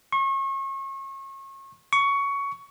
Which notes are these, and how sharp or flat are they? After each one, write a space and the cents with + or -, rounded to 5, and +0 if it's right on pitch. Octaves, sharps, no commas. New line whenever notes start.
C#6 -35
C#6 +15